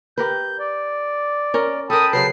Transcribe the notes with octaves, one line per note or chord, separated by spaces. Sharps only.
G4 A#4 B4 G6
D5
C#4 A#4
A4 A#4 G5 A5 B5 D#6
C#3 F#3 B4 C7